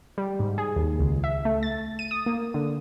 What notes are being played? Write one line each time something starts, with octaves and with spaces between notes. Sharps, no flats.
G3
G#2
G#4
D#2
C#2
E5
A3
A6
D#7
D#6
A#3
D3